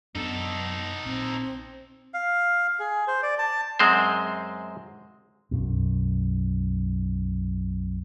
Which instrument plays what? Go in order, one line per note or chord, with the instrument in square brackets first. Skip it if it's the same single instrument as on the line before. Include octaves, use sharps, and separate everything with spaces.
[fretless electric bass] F#2 D4 [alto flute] B3 [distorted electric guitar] D#4 A4
[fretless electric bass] A#1 [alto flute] C4
[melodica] F5
G#4
C5
D5
A5
[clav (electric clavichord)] F#2 G#3 C4 C5
[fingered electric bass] B1 F#2 B2